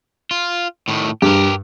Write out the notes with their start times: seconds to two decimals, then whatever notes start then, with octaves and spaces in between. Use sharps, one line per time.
0.31 F4
0.88 A2 D#3
1.22 G2 G4 A#4